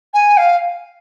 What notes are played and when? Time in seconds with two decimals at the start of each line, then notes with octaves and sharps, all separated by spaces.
0.14 G#5
0.37 F5